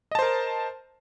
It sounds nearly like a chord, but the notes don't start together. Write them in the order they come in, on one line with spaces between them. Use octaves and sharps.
D#5 A5 C5 A#4